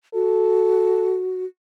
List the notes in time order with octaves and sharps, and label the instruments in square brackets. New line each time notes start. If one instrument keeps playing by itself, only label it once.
[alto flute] F#4 [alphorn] A4